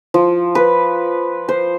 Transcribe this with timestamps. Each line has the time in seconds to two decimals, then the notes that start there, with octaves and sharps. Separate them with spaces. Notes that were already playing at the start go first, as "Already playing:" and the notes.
0.14 F3
0.55 B4
1.49 C5